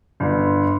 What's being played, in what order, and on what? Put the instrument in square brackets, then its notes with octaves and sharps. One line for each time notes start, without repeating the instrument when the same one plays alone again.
[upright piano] G1